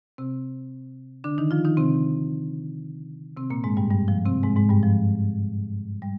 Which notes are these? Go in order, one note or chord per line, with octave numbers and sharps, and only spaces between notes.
C3 C4
D3 D4
D#3 D#4
F3 F4
D#3 D#4
C3 C4
C3 C4
A#2 A#3
G#2 G#3
G2 G3
G2 G3
F3
C3 C4
G#2 G#3
G#2 G#3
G2 G3
F3
G3